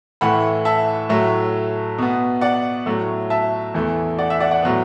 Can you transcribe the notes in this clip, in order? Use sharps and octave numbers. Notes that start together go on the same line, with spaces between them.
A2 E3 A3 F#5 B5
E5 A5
A2 F#3 A3
B2 B3
D5 F#5
A2 F#3 A3
E5 A5
E2 E3 A3
D5 F#5
E5
D5 F#5
D5 F#5
A2 F#3 B3